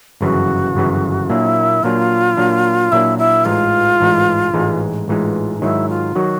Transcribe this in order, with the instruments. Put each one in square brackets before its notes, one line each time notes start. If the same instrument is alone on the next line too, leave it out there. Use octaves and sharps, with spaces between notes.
[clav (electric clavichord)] G1 F#2 C#3 E3 [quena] F#4
[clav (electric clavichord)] G1 F#2 C#3 E3
[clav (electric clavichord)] A#2 F#3 A#3 D4 [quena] E4
[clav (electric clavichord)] A#2 F#3 A#3 D4 [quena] F4
[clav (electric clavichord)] A#2 F#3 A#3 D4
[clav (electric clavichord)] A#2 F#3 A#3 D4 [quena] E4
[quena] E4
[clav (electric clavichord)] A1 G#2 E3 G#3 [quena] F4
[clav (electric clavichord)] A1 G#2 E3 G#3
A1 G#2 E3 G#3
[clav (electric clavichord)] A1 G#2 E3 G#3 [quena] F4
[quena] D#4
[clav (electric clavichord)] G#2 D#3 F#3 [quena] E4
[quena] F4
[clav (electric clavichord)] D#3 F#3 [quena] F#4